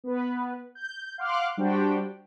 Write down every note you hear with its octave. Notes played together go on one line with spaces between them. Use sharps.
B3 B4
G6
F5 F#5 C6 D6 F6 F#6
G3 D4 F#4 G4 C5 G5